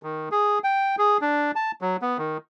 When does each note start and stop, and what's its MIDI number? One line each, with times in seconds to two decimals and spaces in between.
0.03 0.29 51
0.31 0.59 68
0.64 0.96 79
0.98 1.18 68
1.21 1.51 62
1.55 1.71 81
1.81 1.97 54
2.02 2.18 59
2.18 2.37 51